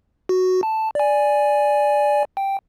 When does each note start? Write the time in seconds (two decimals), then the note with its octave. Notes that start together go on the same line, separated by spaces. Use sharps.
0.29 F#4
0.63 A5
0.95 D5 G#5
2.37 G5